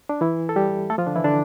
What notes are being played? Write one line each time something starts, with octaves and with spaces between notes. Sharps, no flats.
D4
E3 E4
A4
G3 G4
A3 A4
F3 F4
D3 D4
E3 E4
D3 D4